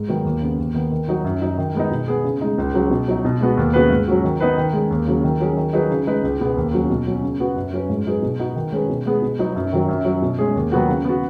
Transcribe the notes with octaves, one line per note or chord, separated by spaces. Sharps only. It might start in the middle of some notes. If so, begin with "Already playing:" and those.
Already playing: G#2
D#3 F#3 B3
D#2
C#3 B3
D#2
D#3 B3
D#3
F#3 D#4 F#4
F#2
F#3 D#4
D#3
G#3 B3 D#4
B2
B3 G#4
C#3
G#3 D#4
C#2
C#3 F#3
B2
F#3 D#4
B2
G#3 B3 F#4
D#2
C#3 B3 F#4 B4
G#2
F#3 C#4 F#4
D#3
B3 D#4 B4
D#3
G#3 C#4
D#2
C#3 F#3
D#3
F#3 C#4 G#4
D#3
F#3 D#4 G#4 B4
C#3
G#3 D#4 B4
C#2
B2 B3 G#4 B4
D#2
C#3 F#3 C#4
B2
F#3 C#4
C#3
B3 F#4 B4
F#2
F#3 C#4 B4
G#2
F#3 D#4 G#4 B4
B2
B3 D#4 F#4
D#3
G#3 C#4 G#4 B4
B2
G#3 B3 G#4
B2
F#3 B3 D#4
F#2
D#3 F#3
F#2
F#3 C#4
B2
G#3 C#4 G#4
D#2
D#3 F#3 B3 F#4
C#3
B3 F#4